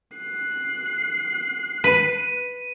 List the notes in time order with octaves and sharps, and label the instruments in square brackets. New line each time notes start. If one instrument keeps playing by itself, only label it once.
[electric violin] F#6 C7
[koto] B4 [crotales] D#7